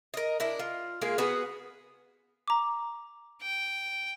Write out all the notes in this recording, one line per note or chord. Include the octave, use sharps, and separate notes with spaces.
A#4 D#5
D4 E4 A#4
F4
G#3 A#3 F4 G#4
B3 F#4 G#4 B4
A#5 D6
G5